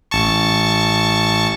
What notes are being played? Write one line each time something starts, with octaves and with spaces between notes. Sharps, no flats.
A1 A5 C#6